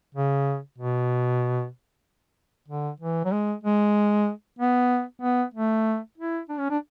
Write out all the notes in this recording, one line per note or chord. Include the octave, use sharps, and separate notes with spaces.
C#3
B2
D3
E3
F#3
G#3
G#3
B3
B3
A3
E4
D4
C#4
D4